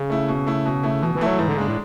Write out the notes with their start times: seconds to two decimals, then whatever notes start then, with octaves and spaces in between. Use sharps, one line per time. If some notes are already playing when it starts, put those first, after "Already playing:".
Already playing: C#3
0.10 A3 E4
0.28 B2
0.47 A3 E4
0.66 B2
0.83 A3 E4
1.02 B2 E3
1.15 E3
1.21 A3 E4
1.26 F#3
1.39 G#2 E3
1.48 D3
1.57 C#3 G#3 D4
1.68 A2